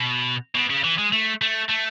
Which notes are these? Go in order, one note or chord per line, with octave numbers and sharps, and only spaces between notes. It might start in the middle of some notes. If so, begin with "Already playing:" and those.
Already playing: B2
B2
C#3
E3
G#3
A3
A3
A3